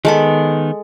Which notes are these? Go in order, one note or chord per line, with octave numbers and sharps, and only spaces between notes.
D#3 G#3 B3 A4 B5